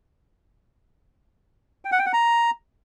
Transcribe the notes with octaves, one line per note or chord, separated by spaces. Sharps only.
G5
F#5
G5
F#5
A#5